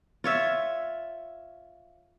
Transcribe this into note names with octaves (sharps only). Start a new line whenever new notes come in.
F4 C#5 E5